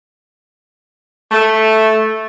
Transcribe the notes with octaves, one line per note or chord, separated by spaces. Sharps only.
A3